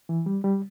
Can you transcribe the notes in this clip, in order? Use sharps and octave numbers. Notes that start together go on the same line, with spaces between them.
E3
G3
G3